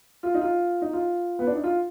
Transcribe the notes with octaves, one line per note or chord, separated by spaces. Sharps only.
F4
D#4
F4
D#4
F4
B3
D4
D#4
F4